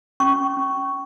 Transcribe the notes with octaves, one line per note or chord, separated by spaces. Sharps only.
C#4 C#6
C#4